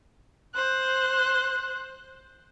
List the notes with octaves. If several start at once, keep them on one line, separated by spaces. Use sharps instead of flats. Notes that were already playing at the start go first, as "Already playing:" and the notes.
C5 F#6